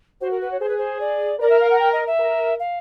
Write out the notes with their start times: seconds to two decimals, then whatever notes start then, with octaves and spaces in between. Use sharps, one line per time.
0.21 F#4 C5
0.31 A#4
0.41 B4
0.51 C#5
0.60 G#4 C5
0.69 B4
0.78 C5
1.00 D5
1.39 A#4 D5
1.50 E5
1.60 F5
1.70 F#5
1.79 G5
1.93 D#5
2.07 E5
2.19 A#4
2.59 F5